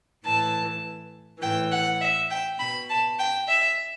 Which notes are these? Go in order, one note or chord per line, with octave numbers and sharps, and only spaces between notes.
A2 E3 A5
A2 E3 G5
F#5
E5
G5
B2 B5
A5
G5
E5